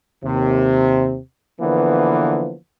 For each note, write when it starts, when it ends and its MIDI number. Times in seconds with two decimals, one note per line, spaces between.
0.23 1.18 39
0.23 1.18 48
1.60 2.54 50
1.60 2.54 52
1.60 2.54 53
1.60 2.54 58
1.60 2.54 59